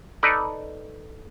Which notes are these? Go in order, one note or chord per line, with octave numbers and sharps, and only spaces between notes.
D#4 A4 B4 D5